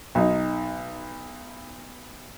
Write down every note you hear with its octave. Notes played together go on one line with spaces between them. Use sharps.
B1 D#4